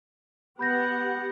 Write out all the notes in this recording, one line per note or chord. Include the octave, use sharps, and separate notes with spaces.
B3 G4 F#5 B5 G6 A#6